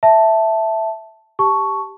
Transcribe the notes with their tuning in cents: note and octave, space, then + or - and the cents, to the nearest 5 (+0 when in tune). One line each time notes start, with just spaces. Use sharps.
E5 +0 A5 +0
G4 +0 A5 +0 C#6 +5